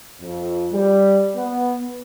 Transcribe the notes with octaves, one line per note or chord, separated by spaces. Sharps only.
F2
G3
B3